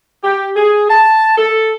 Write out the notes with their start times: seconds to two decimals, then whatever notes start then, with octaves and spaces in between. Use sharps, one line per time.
0.23 G4
0.56 G#4
0.90 A5
1.38 A4